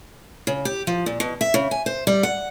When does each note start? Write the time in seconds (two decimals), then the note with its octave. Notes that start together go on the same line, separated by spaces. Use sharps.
0.47 C#3
0.65 G4
0.87 F3
1.06 A#2
1.20 B2
1.41 E5
1.54 C#3
1.71 G#5
1.86 C5
2.07 G3
2.23 F#5